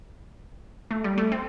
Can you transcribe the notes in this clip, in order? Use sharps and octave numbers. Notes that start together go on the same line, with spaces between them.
A3
G3
A3
C4